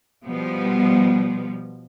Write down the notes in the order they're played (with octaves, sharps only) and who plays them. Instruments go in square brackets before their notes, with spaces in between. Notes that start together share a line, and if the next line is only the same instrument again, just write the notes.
[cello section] B2 F3 G3 B3